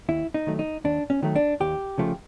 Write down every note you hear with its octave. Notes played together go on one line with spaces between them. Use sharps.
D#2 E4
D#4
D#3 F#3 A3
D#4
D#2 D4
C#4
D#3 F#3 A3
D4
D#2 G4
C#3 F3 A3